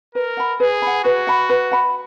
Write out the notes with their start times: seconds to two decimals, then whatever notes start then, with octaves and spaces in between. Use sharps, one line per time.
0.15 A#4 B4
0.37 F#5 B5
0.60 G#4 B4
0.82 F#5 B5
1.04 F#4 B4
1.27 F#5 B5
1.50 B4
1.72 F#5 B5